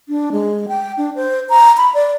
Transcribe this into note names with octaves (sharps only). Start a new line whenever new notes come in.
D4
G#3
G5
D4
C5
A#5
B5
D5